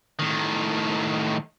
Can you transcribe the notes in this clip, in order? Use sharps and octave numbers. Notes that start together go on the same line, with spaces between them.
A2 D#3